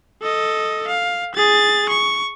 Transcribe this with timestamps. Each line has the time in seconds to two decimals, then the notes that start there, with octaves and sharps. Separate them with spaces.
0.21 A4 D#5
0.88 F5
1.35 G#4 A6
1.89 C#6